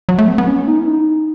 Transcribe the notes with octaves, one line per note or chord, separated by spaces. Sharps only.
F#3
A3
B3
B3
C#4
D#4
E4
D#4